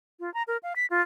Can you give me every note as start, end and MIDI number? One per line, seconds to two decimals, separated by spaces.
0.20 0.32 65
0.34 0.43 82
0.48 0.57 70
0.63 0.73 77
0.76 0.86 95
0.90 1.02 65